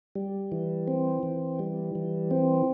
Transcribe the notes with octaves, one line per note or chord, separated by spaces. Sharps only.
G3
E3
C4
E3
G3
E3
C4